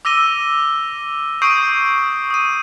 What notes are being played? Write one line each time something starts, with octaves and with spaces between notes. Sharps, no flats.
D6 E6 A#6 D#7 G7
C#6 D#6 G6 C7 D7 D#7
D#6 D#7